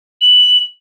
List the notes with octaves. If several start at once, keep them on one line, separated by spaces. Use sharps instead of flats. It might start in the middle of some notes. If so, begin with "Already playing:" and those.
F#7